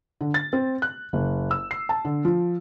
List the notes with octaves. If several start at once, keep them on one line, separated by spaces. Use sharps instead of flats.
D3
A6
C4
F#6
F#1
E6
C7
A5
D3
F3